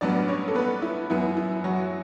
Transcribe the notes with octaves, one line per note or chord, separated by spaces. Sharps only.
A1 G2 F#3 B3 D4 D5
C#4 C#5
A4
B3 B4
E4
F#2 E3 B3 E4
E4
F#3 F#4